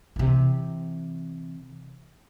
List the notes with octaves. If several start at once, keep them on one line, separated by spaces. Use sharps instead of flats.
C3 E3